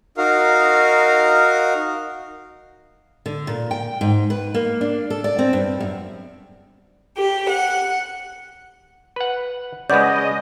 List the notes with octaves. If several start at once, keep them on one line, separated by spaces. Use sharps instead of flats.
D#4 F#4 A#4 F5
D3
A#2
G5
G#2
B4
A#3
D4
A4
D5
C4
G2
F#2
G4
F#5
B4 F#5
C#3 G#3 B4 D5 D#5 F#5 G6